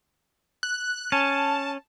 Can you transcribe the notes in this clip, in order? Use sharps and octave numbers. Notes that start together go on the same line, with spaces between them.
F#6
C#4 A5